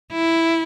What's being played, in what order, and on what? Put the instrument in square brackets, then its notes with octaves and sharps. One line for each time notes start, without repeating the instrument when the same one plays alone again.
[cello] E4